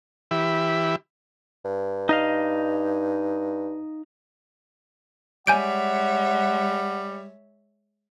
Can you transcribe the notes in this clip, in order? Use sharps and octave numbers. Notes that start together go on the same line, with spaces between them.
E3 G4 E5 B5
G2
D#4 D#5 F5
G3 G#3 C#5 E5 F#5 G#5 G6 D7